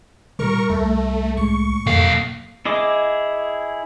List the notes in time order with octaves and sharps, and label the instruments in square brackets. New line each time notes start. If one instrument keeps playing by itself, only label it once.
[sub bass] A#2 [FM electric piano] G3 A#6 [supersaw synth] A#4 C#6
[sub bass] C2 [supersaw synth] A3
[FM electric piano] A2 G#3 A3 [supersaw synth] C#6
[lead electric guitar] B1 F5 [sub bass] F2 [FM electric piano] A#3 A4 E5
[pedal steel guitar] E4 G#4 D#5 D6